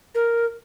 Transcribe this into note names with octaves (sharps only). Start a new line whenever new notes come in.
A#4